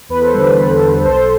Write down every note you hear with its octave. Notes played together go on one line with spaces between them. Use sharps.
E2 B4
A4 C5
D3 G3 B4
E2 B4
D3 G3
B1 A4 C5